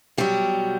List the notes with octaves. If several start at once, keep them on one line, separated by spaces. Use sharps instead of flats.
B2 F#3 G3 G4